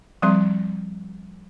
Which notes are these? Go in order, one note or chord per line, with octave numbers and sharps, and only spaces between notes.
F3 G3 C4 C6